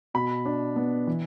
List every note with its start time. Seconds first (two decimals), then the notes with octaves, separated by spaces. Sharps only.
0.14 B2 B5
0.45 D4
0.76 B3
1.07 E3